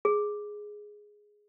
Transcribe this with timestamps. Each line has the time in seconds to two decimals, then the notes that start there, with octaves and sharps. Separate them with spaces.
0.05 G#4